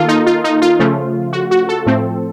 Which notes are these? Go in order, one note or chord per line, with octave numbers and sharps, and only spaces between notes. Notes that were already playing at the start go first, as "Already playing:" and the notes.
Already playing: D#3 A#3 F4 A4
D#4
F4
D#4
F4
C#3 F3 A3
F#4
F#4
A4
A2 F3 A3 C4